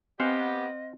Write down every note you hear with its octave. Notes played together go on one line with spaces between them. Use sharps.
B3 C4 G4 C5 D#5 F5 F#5